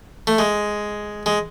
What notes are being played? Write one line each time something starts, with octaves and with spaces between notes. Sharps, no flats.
A3
G#3
G#3